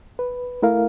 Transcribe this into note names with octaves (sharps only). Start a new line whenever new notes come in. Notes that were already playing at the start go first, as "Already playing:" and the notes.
B4
A3 E4 A#4 F5